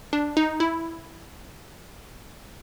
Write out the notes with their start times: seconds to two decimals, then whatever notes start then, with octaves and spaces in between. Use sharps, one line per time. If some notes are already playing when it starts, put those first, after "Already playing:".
0.13 D4
0.37 D#4
0.60 E4